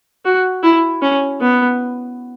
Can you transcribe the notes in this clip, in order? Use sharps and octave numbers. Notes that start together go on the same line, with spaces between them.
F#4
E4
C#4
B3